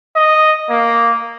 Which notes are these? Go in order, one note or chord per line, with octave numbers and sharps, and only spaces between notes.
D#5
A#3